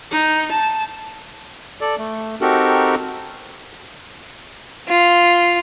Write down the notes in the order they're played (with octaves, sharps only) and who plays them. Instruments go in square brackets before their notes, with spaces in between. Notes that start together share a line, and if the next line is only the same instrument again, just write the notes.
[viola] D#4
A5
[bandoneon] A4 D5
A3
C4 D#4 F#4 G4 A4 A#4
[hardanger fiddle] F4